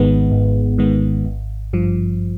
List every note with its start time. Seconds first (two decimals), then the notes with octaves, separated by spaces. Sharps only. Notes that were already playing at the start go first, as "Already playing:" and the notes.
Already playing: G#1 G#2 D#3 G#3 B3
0.32 G#1
0.78 G#2 D#3 G#3 B3
1.25 G#1
1.73 G2 F3